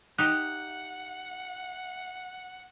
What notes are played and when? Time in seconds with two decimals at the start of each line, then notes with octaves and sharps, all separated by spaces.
0.18 D#4 G4 F#5 F#6